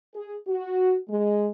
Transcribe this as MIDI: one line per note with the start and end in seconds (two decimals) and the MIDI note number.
0.15 0.37 68
0.48 0.97 66
1.09 1.48 56